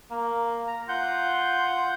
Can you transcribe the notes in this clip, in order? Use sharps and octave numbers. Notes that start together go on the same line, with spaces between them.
A#3
A#5
F4 F#5 G6